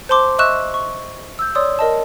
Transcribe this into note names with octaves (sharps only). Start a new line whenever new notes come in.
C5 A5 C6 D6
D#5 E5 C#6 E6 F#6 E7
C#6
E6 G6
C#5 D5 C6 D#6 E6
A#4 D#5 A5